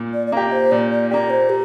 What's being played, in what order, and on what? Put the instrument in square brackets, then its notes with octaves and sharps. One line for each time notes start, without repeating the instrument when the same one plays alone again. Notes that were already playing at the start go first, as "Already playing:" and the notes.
Already playing: [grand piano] A#2
[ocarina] D5
D5
[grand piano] A#3 G4 [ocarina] F5
[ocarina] C5
[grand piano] A#2 [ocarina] D5
[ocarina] D5
[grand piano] A#3 G4 [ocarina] D5
[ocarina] C5
G4